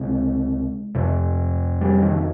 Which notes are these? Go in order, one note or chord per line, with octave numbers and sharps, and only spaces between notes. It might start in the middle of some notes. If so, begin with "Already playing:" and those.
Already playing: C#2 C3 G#3
F2 C3
G3
D#3